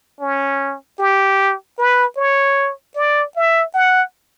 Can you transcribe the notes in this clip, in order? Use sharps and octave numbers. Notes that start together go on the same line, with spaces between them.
C#4
G4
B4
C#5
D5
E5
F#5